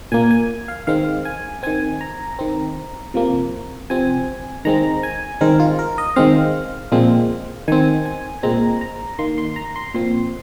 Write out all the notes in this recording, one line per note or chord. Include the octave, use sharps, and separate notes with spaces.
A#2 A#3 G#5
G#5
F5
D#3 G#3 C4 F5
G#5
D#3 C4 G#5
A#5
D#3 C4
C3 F3 A#3
C3 F3 C4 G#5
D#3 G#3 C4 A#5
G#5
D#3 G#3 C4 A#4
F4
A#4
D#5
D#3 G#3 C4 F5
A#2 F3 G#3 C4
D#3 C4 G#5
G#5
A#2 G#3 C4 A#5
A#5
D#3 A#3 C6
C6
A#5
C6
A#2 F3 C4 C6